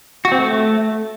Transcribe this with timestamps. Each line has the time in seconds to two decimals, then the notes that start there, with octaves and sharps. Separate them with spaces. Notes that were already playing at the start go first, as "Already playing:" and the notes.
0.25 F#4
0.32 C4
0.39 A3